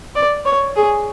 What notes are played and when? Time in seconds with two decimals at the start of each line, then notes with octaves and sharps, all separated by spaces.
0.15 D5
0.45 C#5
0.76 G#4